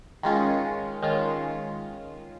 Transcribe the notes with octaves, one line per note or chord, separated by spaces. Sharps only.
D#3 G#3 C#4 F4
D#3 G#3 C#4 F4